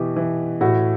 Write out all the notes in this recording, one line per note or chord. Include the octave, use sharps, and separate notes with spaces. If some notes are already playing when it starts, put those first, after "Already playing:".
Already playing: B2 E3 G4
E3
A2 F#4